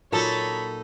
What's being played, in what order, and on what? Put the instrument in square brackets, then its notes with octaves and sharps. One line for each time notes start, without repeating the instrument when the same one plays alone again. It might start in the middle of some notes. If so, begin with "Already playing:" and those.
[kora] A#2 F#3 G#4 [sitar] D#4 A4 [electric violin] C#5 B5